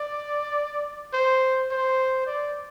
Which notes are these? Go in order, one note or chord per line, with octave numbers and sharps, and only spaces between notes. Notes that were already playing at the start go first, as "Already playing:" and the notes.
Already playing: D5
C5
C5
D5